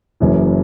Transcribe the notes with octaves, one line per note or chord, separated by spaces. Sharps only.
F#1 F#2 E3